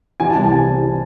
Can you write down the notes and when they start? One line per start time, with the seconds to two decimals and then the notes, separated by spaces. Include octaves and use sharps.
0.20 E3 G#5
0.30 A5
0.35 C2
0.41 A5
0.51 C3 G#5
0.67 C3
0.83 E3